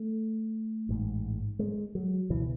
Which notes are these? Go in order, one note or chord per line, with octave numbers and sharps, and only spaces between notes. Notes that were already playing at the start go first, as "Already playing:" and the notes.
Already playing: A3
A1 G#2
G#3
F#3
C#2 B2 E3